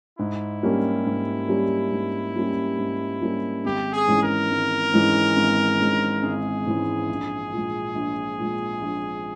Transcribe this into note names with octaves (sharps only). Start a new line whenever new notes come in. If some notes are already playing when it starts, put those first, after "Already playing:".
G#2 E4
G3 A#3 C#4 G4
G#2
G3 A#3 C#4 G4
G#2
G3 A#3 C#4 G4
G#2
G3 A#3 C#4 G4
G#1 G4
G#4
G#2 E3 G#3 C#4
A#4
G#1
G#2 E3 G#3 C#4
G#1
G#2 E3 G#3 C#4
G#1 G#4
G#2 E3 G#3 C#4
A#1
A#2
G#3
A#1
A#2 G#3
A#1